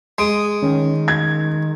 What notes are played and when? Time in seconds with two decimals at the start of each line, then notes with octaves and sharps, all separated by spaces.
0.18 G#3 D#6 D7
0.62 D#3 C#4
1.08 G#6